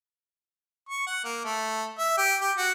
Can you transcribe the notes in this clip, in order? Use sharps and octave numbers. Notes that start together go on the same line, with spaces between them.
C#6
F#5
A#3
A3
E5
G4
G4
F#4